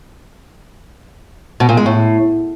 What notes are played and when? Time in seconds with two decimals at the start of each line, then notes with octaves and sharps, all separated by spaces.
1.60 B2
1.69 A#2
1.77 G#3
1.86 A2